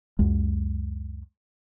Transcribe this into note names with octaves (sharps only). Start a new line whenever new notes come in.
C#2 F#2 G#3